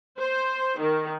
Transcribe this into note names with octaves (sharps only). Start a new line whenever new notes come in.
C5
D#3